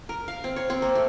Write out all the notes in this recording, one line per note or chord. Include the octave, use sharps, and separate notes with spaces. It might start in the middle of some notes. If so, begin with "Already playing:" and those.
A#4
F5
C4
C#5
C4
A#3
A3